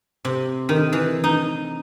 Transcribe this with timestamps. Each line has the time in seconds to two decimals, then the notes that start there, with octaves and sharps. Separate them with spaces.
0.25 C3
0.69 D#3
0.93 E3
1.24 D#4